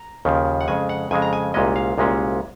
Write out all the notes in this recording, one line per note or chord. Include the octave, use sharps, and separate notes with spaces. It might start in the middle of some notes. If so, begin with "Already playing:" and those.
Already playing: A#5
D#2 C#3 F3
F#5
F2 C#3 G#3 G#5
F#5
F2 C#3 G#3 G#5
A#5
G#5
C2 A#2 G#3 C#4 D#5
F5
C2 A#2 G#3 C#4